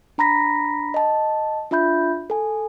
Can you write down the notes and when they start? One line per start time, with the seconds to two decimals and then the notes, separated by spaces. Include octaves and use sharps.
0.18 D4 A#5 B5 A#6 B6
0.94 D#5 A5
1.71 D4 F4 E5 B5 G6
2.30 A4 G#5